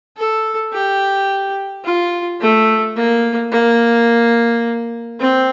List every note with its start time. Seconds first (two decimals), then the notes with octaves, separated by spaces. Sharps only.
0.17 A4
0.73 G4
1.84 F4
2.41 A3
2.96 A#3
3.52 A#3
5.20 C4